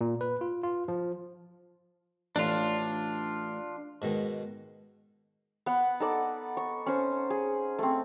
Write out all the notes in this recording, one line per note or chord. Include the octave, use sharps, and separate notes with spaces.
A#2
B4
F4
F4
F3
A1 A2 D4 F4 F5
G#2 B2 D#3
B3 F#5
D#4 A4 D5
C#6
C#4 C5
G#4
A3 C4